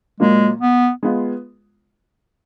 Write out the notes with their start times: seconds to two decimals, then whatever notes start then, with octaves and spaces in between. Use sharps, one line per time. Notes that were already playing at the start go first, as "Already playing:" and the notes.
0.20 A#2 F#3 G#3 A#3
0.62 B3
1.03 G#3 B3 F4